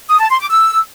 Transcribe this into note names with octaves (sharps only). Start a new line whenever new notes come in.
D#6
A5
C6
D6
E6